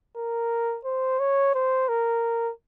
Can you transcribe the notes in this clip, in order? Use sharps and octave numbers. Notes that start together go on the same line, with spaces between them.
A#4
C5
C#5
C5
A#4